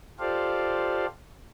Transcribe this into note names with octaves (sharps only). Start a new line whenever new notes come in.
F4 G4 A4 C5 D5 F5